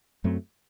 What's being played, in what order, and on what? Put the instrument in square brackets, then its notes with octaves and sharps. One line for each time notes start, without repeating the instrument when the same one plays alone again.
[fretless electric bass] F#2 F#3 A3 C4